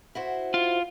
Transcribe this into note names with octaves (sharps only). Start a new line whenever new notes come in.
E4 F#4 C5
F4